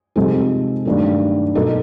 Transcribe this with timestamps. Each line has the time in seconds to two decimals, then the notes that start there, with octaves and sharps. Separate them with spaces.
0.16 C3 F3 G#3 C4 D#4 A4
0.85 G2 D#3 F#3 A3
1.55 B2 F#3 A#3 D#4 A4